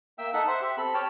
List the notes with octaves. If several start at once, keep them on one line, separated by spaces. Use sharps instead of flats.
A#3 E5 G5 E6
D#4 A4 E5 F#5
C5 E5 F#5
G4 E5
C4 A4 B5
G4 C#5 G5 A5 F6